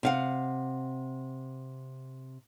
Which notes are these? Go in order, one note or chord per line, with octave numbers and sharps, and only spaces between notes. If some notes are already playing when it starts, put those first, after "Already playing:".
C3 F5 F#5